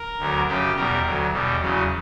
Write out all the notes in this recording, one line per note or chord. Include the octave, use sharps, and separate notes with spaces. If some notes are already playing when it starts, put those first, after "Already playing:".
Already playing: A#4
D2 D3 F#3
F#2 C#3 F#3 G4
E2 B2 G3 A#4
D2 D3 F#3
E2 B2 G3
E2 C#3 F#3